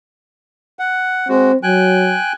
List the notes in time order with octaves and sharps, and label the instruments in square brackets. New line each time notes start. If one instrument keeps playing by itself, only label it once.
[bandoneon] F#5
[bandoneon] G#3 F#4 [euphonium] C4
[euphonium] F#3 [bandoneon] G5 G#5 F#6